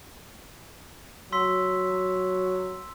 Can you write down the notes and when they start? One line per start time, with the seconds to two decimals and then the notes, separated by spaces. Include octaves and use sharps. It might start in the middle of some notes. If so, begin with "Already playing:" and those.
1.32 F#3 C6 E6 B6